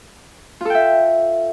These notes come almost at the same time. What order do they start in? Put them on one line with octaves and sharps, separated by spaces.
F4 A4 G5 E5